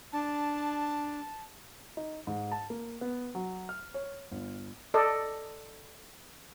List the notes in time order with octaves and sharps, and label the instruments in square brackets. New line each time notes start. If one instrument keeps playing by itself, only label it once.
[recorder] D4 [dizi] A5
[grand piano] D#4
G#2
A5
A#3
B3
F#3
F6
C#5
G1
[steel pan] A4 D5 D#5